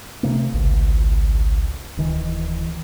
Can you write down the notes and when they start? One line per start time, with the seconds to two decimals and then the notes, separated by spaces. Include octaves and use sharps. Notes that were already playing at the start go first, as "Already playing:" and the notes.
0.23 C3 A3 A#3
0.54 G#1 C#2
1.97 D1 D#3 E3